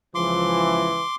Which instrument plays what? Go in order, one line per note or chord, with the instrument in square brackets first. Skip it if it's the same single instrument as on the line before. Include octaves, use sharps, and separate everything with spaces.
[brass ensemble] C#2 E3 [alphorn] F3 [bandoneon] C6 D6